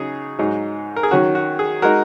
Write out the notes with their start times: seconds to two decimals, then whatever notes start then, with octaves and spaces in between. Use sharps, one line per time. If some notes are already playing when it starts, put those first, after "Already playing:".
Already playing: C#3 F#3 D#4 G#4
0.38 G#2 F#3 D#4
0.96 A#4
1.03 G#4
1.11 D#3 F#3 C#4 F#4
1.35 F#4
1.59 G#4
1.82 G#3 D#4 F#4 A#4